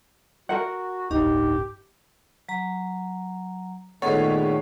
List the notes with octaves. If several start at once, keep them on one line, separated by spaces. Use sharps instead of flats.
F#4 A#4 F#5
D1 G1 D#4 G4
F#3 A#5
A#2 D#3 G#3 A3 B3 G#4 A4 C#5